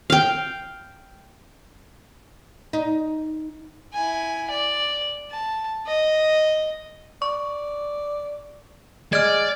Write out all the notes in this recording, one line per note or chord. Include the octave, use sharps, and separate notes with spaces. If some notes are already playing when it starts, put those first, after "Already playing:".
F5 G5
D#4
E4 G#5
D5
A5
D#5
D5 C#6
G#3 D5 F6 G#6